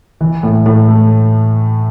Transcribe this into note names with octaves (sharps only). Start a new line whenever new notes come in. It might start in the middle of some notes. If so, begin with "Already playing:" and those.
E3
A2
A2
A3